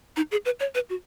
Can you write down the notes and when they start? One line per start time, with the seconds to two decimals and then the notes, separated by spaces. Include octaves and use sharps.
0.17 D#4
0.31 G#4
0.45 B4
0.60 C#5
0.75 B4
0.89 F#4